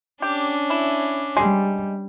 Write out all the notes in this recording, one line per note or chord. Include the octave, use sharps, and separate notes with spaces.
C#4 D4 G4
E4
G3 G#3